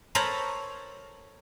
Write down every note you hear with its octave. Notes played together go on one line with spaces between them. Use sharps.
A4 A#4 C5 C#5 A#5 B5